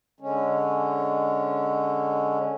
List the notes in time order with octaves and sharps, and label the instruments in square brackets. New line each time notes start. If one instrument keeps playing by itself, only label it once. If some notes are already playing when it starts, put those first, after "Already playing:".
[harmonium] D3 G#3 C#4